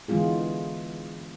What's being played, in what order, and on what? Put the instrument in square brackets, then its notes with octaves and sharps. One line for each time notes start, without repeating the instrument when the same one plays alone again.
[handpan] D3 E3 G#3 B3 F4 G#4